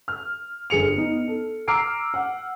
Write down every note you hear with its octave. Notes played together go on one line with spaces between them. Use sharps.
F6
G1 G#4 C#7 F7
B3 D#4
A4
A#5 D6 E6 F6 C7 D7
F#5